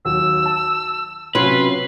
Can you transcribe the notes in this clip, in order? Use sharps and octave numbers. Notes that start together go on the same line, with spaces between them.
D#2 F#3 E6
A5
C3 F#3 C#4 F4 B4 C6